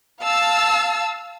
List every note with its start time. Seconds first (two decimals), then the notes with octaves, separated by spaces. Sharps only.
0.23 F5 A5 E6